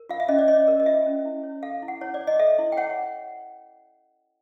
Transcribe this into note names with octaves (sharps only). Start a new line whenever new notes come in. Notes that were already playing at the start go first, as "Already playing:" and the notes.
Already playing: A#4
F4 F5
E5
C#4 D#5
D5
C#5 D#5
A#4
D#5
F4 E5
C#4
E4
C#5
A4 F5
E4
F#5
E4 C#5
D5
C#5
D#5
A4 E5
E4
G5
C#5 F#5